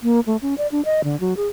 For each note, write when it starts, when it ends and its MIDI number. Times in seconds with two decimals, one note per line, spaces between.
0.03 0.20 58
0.27 0.37 57
0.42 0.55 61
0.58 0.67 74
0.72 0.84 62
0.85 1.04 75
1.04 1.19 50
1.20 1.36 54
1.37 1.48 68